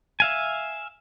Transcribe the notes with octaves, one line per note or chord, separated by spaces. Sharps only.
E5 F5 G#5